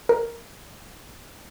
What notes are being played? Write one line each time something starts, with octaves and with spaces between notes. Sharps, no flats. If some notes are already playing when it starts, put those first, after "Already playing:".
A#4